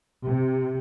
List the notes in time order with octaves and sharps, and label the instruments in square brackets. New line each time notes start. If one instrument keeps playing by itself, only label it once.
[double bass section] C3